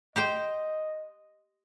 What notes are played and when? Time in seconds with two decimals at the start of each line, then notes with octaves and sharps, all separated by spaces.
0.16 G4 C5 D#5 G5